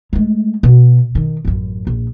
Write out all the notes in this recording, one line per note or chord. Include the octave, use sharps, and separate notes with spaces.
G#3 A3
B2
D#3
A1 F#2
A#1